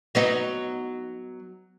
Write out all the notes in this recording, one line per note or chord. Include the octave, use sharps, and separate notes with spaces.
F#3 B3 D#4